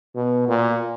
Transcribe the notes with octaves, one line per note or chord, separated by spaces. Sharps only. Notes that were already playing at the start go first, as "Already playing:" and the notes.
B2
A#2